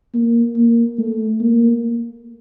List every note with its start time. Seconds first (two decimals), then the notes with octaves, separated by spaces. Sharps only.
0.14 A#3
0.57 A#3
0.98 A3
1.41 A#3